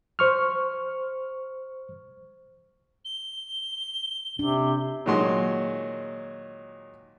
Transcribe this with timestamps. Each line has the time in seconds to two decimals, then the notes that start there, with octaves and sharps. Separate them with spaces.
0.19 C5 C#6 F6
3.05 G7
4.39 C3 D4
5.06 A#2 D#3 F#3 G#3 C6